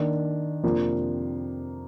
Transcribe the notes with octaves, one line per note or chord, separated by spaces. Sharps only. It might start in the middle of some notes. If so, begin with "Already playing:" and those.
Already playing: D#3 A#3 D4
F2 C3 F3 A#3 D4